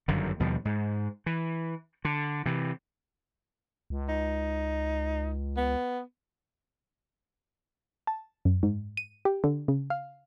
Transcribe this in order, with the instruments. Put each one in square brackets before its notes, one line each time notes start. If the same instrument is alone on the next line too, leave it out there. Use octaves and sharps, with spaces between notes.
[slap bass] G1 F#2 D3 D#3
D#2 B2 F3 G3
G#2
E3
D3
C3 E3
[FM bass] C#2
[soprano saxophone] D#4
B3
[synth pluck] A5
F#2
G#2
D#7
G4
D3
C#3
F5